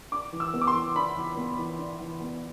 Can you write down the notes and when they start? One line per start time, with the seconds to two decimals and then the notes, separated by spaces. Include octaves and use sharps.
0.12 D4 D6
0.32 E3
0.40 E6
0.54 B3
0.61 D6
0.67 C6
0.75 E3
0.95 D4 B5
1.17 E3
1.37 B3
1.58 E3
1.78 D4
2.00 E3
2.21 B3